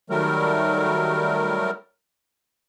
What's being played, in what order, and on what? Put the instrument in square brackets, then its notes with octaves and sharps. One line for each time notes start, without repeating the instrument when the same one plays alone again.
[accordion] D#3 F#3 G3 A3 A#4